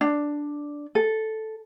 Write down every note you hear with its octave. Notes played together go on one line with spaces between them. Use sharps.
D4
A4